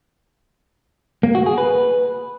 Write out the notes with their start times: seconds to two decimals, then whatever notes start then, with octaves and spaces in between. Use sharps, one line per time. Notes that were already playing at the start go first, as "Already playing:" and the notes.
1.23 A#3
1.35 F#4
1.46 G#4
1.58 B4